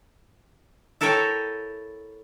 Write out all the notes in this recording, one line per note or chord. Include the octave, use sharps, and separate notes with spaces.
E4 A4 A#4 C#5 G5 G#5